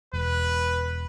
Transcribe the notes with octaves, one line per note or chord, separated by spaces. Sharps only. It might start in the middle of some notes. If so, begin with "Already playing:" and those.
E1 B4